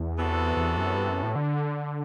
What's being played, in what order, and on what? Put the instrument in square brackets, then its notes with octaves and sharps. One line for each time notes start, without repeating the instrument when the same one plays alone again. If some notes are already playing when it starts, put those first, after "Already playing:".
Already playing: [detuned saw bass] E2
[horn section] C3 E3 B3 F#4 A4
[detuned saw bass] E2
F#2
G2
F#2
A2
D3